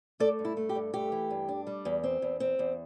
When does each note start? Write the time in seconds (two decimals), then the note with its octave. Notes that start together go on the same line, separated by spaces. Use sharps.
0.20 A3 A4 D5
0.39 G2
0.45 E4
0.57 A3
0.69 G4
0.75 G2
0.94 A3 G4
1.12 E3
1.30 G2
1.48 D4
1.67 G3
1.85 E2
2.04 C4
2.22 E2
2.40 C4
2.59 E2